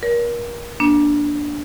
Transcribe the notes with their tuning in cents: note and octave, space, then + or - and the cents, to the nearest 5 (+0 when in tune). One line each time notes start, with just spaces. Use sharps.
A#4 +30 C#5 +45
A#3 +35 D4 +0